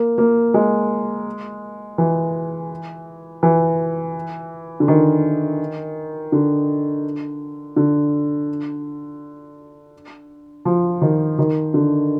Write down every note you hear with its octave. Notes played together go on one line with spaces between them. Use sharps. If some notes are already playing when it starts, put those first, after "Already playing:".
Already playing: A#3
A#3
G#3
E3
E3
D3
D#3
D3
D3
F3
D#3
D#3
D3